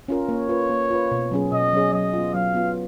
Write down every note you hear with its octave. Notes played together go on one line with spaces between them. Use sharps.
C#4 F4 A#4
A#3 C#5
F4 B4
A#3
F4 B4
B2
F#3 C#4 G#4
B2 D#5
F#3 C#4 G#4
F#3 D#5
B3 F4
F#3 F5
B3 F4